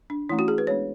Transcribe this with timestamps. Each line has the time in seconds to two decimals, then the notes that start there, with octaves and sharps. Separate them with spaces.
0.10 D4
0.29 E3 A3 C#4 E4
0.39 F#4
0.48 G#4
0.58 B4
0.67 G#3 B3 D4 C#5